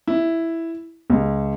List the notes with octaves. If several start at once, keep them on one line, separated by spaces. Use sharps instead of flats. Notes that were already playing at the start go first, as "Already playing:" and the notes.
E4
C#2